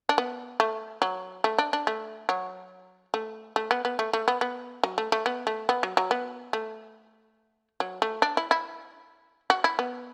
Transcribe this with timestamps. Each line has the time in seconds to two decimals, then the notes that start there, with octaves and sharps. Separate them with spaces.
0.09 D4
0.18 B3
0.60 A3
1.02 F#3
1.44 A3
1.58 D4
1.73 D4
1.87 A3
2.29 F#3
3.14 A3
3.56 A3
3.71 B3
3.85 B3
3.99 A3
4.13 A3
4.28 B3
4.41 B3
4.83 F#3
4.98 A3
5.12 A3
5.26 B3
5.47 A3
5.69 B3
5.83 F#3
5.97 F#3
6.11 B3
6.53 A3
7.80 F#3
8.02 A3
8.22 D4
8.37 E4
8.51 E4
9.50 F#4
9.64 E4
9.79 B3